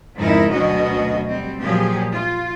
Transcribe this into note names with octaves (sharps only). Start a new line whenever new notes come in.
F2 G#2 C#3 D#4 E4 A#4
D2 B2 F#3 C#4 F#4 D#5
G3 C4
A#2 F3 F#3 G4 G#4
F4